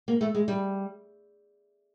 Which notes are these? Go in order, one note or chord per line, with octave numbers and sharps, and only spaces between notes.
A#3
A3
G#3
G3